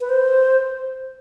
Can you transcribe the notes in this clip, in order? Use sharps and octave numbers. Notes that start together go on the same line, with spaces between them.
B4
C5